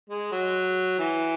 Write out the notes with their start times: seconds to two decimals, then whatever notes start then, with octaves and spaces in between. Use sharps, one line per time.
0.10 G#3
0.32 F#3
0.99 E3